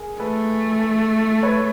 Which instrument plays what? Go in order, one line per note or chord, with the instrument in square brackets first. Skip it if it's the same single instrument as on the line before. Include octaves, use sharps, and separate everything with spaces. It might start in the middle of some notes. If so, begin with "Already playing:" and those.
Already playing: [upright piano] G#4 A#4
[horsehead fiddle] A3 [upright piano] A4 B4
[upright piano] B4 C#5